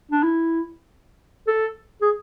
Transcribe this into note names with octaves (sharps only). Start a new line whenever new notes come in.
D4
E4
A4
G#4